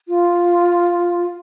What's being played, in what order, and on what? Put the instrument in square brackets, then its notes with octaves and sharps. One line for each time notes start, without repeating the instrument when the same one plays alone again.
[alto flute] F4